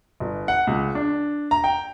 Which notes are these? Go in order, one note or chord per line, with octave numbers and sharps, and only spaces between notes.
G1
F#5
C#2
D4
A#5
G5